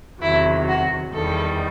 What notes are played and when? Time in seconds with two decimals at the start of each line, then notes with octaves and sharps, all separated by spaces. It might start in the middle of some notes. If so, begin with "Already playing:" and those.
0.21 E2 C3 D#3 F#3 E4
0.67 F#4
1.13 E2 D#3 G3 A4